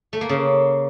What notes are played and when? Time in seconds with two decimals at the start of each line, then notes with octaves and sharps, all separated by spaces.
0.13 A3
0.21 A#3
0.29 C#3